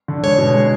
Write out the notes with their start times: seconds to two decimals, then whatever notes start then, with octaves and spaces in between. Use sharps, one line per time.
0.08 D3
0.24 G#3 C#5
0.38 B2
0.55 G#3